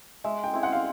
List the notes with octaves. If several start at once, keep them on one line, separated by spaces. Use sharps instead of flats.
G#3 E5
G5
C4 E4
F#5
F5